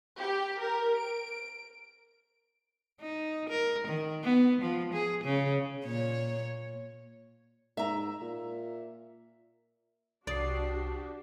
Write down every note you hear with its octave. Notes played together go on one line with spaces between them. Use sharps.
G4
A#4
D7
D#4
A#4
D#3
B3
F3
G#4
C#3
A#2 C#5
G#2 E5 A#5
A#2
C2 D4 F#4 G4 D5 D#6 C7